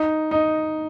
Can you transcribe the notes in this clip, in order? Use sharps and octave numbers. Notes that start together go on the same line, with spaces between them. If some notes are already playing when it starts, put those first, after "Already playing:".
Already playing: D#4
D#4